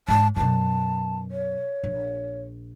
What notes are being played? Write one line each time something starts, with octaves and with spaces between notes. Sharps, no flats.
G#2 G#3 A5
F#2 B2 A5
C#5
A#1